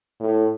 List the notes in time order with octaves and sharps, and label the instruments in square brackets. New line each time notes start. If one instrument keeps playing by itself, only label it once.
[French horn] A2